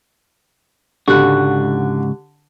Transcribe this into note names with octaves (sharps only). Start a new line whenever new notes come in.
C#2 G#2 D3 F#4 G4 F#6